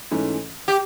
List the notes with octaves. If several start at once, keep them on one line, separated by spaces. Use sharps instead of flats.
G#2 E3 A3 C#4
G4